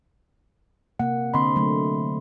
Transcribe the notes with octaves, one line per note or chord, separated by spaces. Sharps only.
C3 A#3 F#5
D3 C4 D#5 B5 C6
D3 F#3 A3